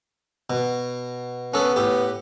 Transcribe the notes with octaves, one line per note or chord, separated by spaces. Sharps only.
B2
B3 C#4 A4
A2 G4